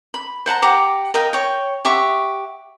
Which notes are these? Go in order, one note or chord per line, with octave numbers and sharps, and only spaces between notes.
B5
C5 F#5 A5 A#5
G4 F#5 A#5 D6
A#4 D#5 F5 G5
C#5 G5
G4 E5 F#5 C#6